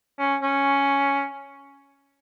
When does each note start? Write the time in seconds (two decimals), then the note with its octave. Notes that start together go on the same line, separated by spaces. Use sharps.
0.19 C#4
0.43 C#4